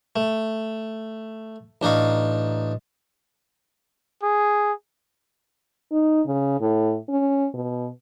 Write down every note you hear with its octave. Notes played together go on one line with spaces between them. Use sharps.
A3
A1 D4 D#4 F5 C#6
G#4
D#4
C#3
A2
C#4
B2